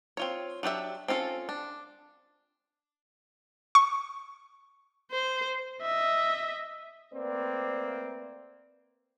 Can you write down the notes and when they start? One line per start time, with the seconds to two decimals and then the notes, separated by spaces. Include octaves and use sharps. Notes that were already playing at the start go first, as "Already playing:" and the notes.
0.17 C4 F4 C#5
0.63 F#3 D4 G4 E5
1.08 C4 C#4 F4 A4
1.49 D4
3.75 C#6
5.12 C5
5.81 D#5 E5
7.14 A3 A#3 C4 B4 D5